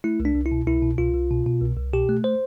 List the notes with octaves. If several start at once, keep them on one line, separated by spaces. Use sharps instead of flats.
A3 E4
C2
D4
C2
E4
B2
C2 E4
B2
C2 F4
C2
B2
B2
C2
C2
B2 G4
A3
C5